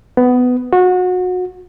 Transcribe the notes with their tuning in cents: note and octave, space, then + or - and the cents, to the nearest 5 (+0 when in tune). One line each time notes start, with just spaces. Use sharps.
B3 +15
F#4 -25